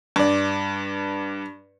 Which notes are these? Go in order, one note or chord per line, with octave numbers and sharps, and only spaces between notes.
G2 D5